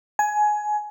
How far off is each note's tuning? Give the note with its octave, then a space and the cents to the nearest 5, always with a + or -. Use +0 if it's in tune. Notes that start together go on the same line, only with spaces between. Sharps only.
G#5 +20